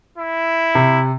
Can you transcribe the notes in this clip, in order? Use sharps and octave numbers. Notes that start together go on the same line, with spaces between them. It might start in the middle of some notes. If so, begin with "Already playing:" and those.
E4
C3